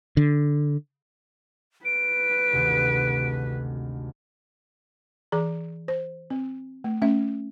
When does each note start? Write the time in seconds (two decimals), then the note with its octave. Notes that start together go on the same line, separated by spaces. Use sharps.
0.17 D3
1.85 B4 D7
2.52 G#1 D2 C3
5.32 E3 G#4 A#5
5.88 C5
6.30 C4
6.84 A3
7.02 A3 C#4 E5